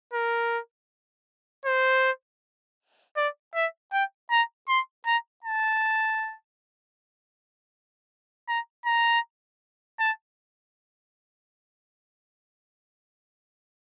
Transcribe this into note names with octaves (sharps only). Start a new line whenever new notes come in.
A#4
C5
D5
E5
G5
A#5
C6
A#5
A5
A#5
A#5
A5